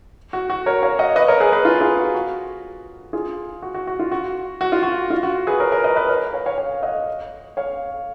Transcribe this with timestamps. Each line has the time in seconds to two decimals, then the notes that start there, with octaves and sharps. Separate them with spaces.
0.33 F#4
0.50 F#4
0.66 A#4 C#5
0.83 C#5 F5
0.99 D#5 F#5
1.16 B4 D#5
1.28 A#4 C#5
1.40 G#4 B4
1.53 G#4 B4
1.65 F4
1.81 F4 G#4
1.98 F#4
2.14 F#4
3.13 F4 G#4
3.62 F#4
3.74 F#4
3.87 F#4
3.99 F4
4.12 F#4
4.61 F#4
4.72 F4
4.83 F#4
5.10 F4
5.23 F#4
5.47 G#4 B4
5.60 A#4 C#5
5.72 A#4 C#5
5.84 B4 D#5
5.96 B4 D#5
6.09 A#4 C#5
6.33 C#5 F5
6.46 C#5 F5
6.58 C#5 F5
6.83 D#5 F#5
7.57 C#5 F5